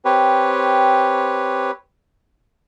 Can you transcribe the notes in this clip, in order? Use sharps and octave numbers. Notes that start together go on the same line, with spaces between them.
C4 G4 B4 C#5